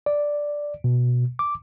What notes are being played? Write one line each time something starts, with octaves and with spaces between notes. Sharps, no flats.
D5
B2
D6